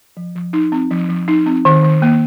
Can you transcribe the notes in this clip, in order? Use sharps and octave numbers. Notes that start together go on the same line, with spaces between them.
F3
F3
D#4
C4
F3
F3
D#4
C4
D#3
D#3
A#3